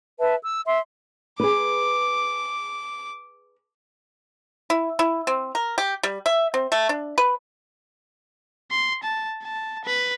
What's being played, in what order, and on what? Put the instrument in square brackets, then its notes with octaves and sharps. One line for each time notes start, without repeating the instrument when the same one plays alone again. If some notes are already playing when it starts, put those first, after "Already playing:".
[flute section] B4 E5 A5
E6
E5 C6
[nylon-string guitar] G#4 B4 [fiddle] D6
[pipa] E4
E4
C4
A#4
G4
G3
E5
C4
A3
D4
B4
[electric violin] C6
A5
A5
B4